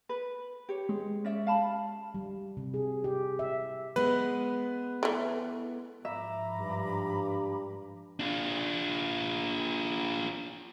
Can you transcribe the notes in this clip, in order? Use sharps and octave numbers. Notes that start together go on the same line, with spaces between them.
B4
G4 C#5
G#3
C#4 D5 E5
F5 A5 B5
G3
C3
G#4
G4
E5
G#3 B3 B4
E3 A3
G#2 F3 E5 A#5 B5 D6
G2
D4 F4